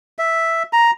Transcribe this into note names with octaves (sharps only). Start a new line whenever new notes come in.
E5
A#5